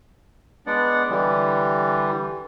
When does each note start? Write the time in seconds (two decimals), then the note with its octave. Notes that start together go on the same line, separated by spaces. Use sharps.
0.66 G#3 B3 D4 D5 F#5
1.10 D3 E3 G3